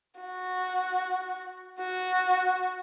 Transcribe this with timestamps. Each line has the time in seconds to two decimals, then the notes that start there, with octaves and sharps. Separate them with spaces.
0.20 F#4
1.80 F#4